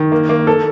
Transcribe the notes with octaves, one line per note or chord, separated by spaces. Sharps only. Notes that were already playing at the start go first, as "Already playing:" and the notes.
Already playing: D#3
A#3
A#3
A4